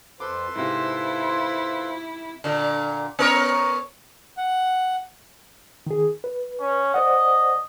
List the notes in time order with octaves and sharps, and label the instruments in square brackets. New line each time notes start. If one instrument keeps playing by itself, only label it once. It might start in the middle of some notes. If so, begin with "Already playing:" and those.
[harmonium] F2 C5 [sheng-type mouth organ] A4 B4 C6 [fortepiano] D6
[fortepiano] G#2 C3 [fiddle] E4 [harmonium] F4 C5
[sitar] A#2 D3
B3 A#4 C#5
[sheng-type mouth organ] F#5
[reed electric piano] D#3 G#4
B4
[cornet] C#4
[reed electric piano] C5 D5 F#5 [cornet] D#5